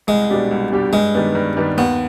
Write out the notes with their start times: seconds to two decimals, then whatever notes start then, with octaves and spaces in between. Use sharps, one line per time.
0.07 C2 G#3
0.30 B2 G3 D4 G4
0.51 C2
0.72 B2 G3 D4 G4
0.93 G2 G#3
1.14 D#3 G3 B3 D4
1.35 G2
1.56 D#3 G3 B3 D4
1.77 D#2 B3